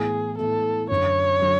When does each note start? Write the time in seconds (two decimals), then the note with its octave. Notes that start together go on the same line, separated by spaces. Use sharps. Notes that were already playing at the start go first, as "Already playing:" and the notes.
Already playing: A2 E3 B3 E4 G#4
0.38 A2 E3 B3 E4 A4
0.90 F#2 D3 F#3 C#5
1.42 D3 F#3